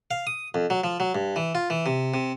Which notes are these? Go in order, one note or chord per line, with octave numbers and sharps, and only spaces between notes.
F5
D#6
F2
F#3
F3
F#3
G2
E3
F4
E3
C3
C3